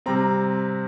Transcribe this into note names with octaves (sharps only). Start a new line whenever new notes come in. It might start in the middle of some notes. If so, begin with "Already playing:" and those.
C3 G3 C4 A#5